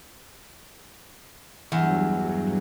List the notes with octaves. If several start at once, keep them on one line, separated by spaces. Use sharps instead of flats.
E2 G2 F#3